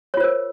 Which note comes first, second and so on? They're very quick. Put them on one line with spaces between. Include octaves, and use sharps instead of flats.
C#5 F4 C5 A#4